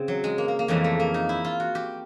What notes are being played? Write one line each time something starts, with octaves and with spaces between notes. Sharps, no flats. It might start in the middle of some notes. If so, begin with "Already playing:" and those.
Already playing: C#3 C4
F#3
G#3
A#3
A#3
A#3
F2 C#3 E3 G#3
A3
A#3
D#4
E4
F4
F#4
G4